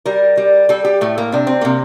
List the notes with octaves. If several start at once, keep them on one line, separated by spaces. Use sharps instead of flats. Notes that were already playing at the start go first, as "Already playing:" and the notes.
G3 A#4
G3
G3 A4
G4
A2 A3
A#3
C3 D4
C4
C3 A#3